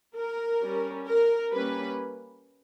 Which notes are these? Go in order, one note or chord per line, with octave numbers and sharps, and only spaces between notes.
A#4
G3 C#4
A#4
G3 A#3 C#4 B4